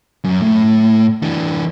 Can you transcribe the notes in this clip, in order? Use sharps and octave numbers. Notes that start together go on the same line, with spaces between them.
F#2
A2
E3 D4